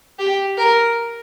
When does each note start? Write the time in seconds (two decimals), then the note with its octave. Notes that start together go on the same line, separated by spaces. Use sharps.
0.19 G4
0.58 A#4